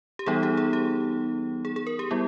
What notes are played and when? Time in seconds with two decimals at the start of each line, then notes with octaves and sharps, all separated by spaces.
0.19 G4
0.26 E3 G3 B3 D#4 G#4
0.43 G4
0.57 G#4
0.73 G4
1.65 G#4
1.76 G#4
1.87 A#4
1.99 G4
2.11 G3 B3 E4